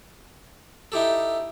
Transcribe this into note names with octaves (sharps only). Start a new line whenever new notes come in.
D#4 E4 G4 A4